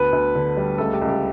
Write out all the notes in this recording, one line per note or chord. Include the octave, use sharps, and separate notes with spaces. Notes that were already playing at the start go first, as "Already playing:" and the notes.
Already playing: D2 B3 B4
D2
D3
G3
C#2 A3 A4
G4
C#2
G4